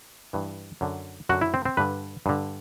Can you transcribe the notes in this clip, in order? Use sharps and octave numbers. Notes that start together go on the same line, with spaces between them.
G2 E3
F#2 D3
F#2 D3 F#4
E4
C4
C4
G2 D3 B4
G2 D3